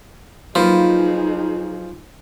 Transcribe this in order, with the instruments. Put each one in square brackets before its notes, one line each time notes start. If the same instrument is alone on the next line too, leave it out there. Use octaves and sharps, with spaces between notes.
[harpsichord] F3 [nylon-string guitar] F#3 A#3 B4 [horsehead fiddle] D#4 G#4 [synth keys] F4